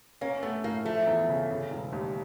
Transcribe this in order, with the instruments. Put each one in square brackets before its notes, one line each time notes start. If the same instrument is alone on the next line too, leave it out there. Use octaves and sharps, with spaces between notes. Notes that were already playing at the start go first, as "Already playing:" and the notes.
[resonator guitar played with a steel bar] A#3 [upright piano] C#4
[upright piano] A3 [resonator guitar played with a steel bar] B3
[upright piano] A2 [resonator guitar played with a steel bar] A#3
[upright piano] F3 [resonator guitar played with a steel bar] A3
[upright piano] E2
C#3
C#3
E1
D#2